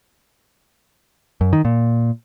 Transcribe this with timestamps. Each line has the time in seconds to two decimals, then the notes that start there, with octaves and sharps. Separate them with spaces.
1.41 F#2
1.53 D#3
1.65 A#2